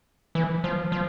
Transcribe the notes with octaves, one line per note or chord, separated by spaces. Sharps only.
E3
F3
F3